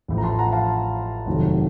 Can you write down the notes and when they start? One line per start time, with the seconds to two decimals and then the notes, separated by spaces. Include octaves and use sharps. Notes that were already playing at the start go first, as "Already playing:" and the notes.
0.08 A1 A2 F3
0.18 A#5
0.23 A5 C6
0.39 F#5 A#5
0.52 F5 A5
1.26 F1 D#2 D#3 F#3 A3